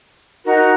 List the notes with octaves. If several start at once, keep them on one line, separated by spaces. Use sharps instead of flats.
D#4 F#4 A#4